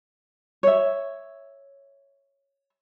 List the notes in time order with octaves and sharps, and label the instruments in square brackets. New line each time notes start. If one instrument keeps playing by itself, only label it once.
[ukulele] C#5 E5